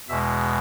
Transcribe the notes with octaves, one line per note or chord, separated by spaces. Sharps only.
E2 B2 G#3 E5